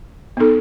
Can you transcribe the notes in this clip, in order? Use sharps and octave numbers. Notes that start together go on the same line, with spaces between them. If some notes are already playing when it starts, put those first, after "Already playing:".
B3 D#4 A4